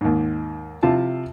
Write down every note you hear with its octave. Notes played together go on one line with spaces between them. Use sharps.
D#2 G#2
C3 F3 E4 F4 A5